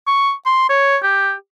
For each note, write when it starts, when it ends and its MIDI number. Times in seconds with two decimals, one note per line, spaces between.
0.07 0.32 85
0.46 0.69 84
0.69 0.97 73
1.03 1.33 67